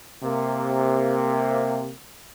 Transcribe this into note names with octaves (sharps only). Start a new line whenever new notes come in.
C3 A#3